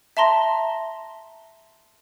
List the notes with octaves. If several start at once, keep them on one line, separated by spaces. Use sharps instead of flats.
E5 A5 A#5 C6 A#6